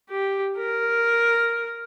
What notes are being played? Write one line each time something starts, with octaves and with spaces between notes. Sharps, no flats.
G4
A#4